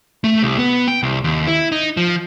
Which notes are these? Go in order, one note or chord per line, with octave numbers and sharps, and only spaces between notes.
A3
C2
B3
G5
C2
D#2
E4
D#4
F3